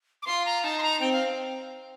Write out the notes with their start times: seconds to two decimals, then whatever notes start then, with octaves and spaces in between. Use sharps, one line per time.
0.22 D6
0.26 F4 C6
0.46 A#5
0.64 D#4 A5
0.78 C6
0.82 A#5
1.01 C4 G5
1.13 F5